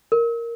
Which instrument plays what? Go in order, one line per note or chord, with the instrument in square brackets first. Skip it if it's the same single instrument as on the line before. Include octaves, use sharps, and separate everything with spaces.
[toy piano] A#4